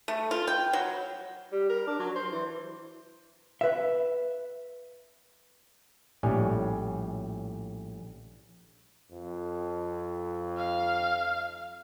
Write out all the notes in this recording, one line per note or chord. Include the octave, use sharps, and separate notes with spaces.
A3
F4
G5
F#3
G3
A#4
D4
F#3
C5
E3
B4 E5
A#1 A2 G3 C#4
F2
F5